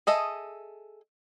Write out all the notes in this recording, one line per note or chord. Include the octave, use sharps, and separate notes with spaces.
G#4 A4 D#5 E5